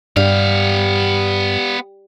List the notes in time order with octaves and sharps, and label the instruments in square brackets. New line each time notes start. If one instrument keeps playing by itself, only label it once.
[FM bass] G2 [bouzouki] G3 [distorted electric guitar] B3 F5